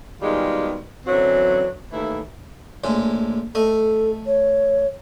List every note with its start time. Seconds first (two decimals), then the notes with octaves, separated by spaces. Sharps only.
0.20 B2 D#3 G3 G#3 F4 G#4
1.05 F#2 D3 E3 F#3 C4 F#4
1.91 D#2 A2 E3 A3 E4
2.84 A#1 A2 G#3
3.55 A3 A4 D#5
4.26 C#5